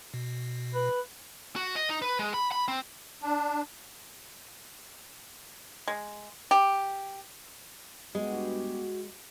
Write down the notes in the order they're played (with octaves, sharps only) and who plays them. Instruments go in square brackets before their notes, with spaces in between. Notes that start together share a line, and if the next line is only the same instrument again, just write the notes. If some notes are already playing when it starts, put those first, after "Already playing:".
[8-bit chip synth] B2
[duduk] B4
[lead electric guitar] F#4
D#5
D#4
B4
G#3
B5
B5
C4
[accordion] D4
[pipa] G#3
G4
[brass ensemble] G2 B3 G4 [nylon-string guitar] G#3 [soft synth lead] F#4